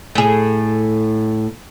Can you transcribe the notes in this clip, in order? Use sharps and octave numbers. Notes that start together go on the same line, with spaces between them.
A2 G#4